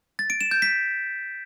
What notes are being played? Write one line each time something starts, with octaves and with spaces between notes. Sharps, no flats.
A6
D7
E7
G6
B6